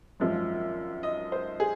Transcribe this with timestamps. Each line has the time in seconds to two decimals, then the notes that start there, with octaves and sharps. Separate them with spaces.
0.20 G#1 F#2 F3 G#3
1.03 D#5
1.32 C5
1.60 G#4